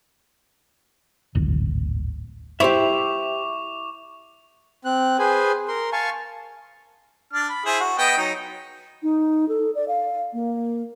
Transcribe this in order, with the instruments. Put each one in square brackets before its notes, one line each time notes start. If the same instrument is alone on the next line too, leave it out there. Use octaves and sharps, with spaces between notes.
[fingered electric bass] D1 G#1
[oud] E4 [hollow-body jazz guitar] G4 C5 E5 [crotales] C#6 D6 F7
[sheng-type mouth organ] C4 F#6
G#4 B4 C5 G#5
A#4 C6
F5 G#5 A5 C#6
[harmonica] D4 F6
B5
E4 G#4 C5
F#4
B3 D#5 G5
F#3 D#4
[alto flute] D#4
A4
D5
F5
A#3